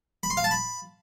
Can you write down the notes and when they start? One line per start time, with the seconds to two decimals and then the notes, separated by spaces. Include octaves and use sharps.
0.23 B5
0.30 C6
0.37 F5
0.44 A5
0.51 B5